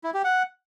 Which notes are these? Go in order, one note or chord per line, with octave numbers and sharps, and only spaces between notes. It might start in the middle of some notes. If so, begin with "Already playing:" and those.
E4
G4
F#5